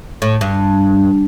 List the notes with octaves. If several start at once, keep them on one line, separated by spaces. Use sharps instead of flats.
A2
G2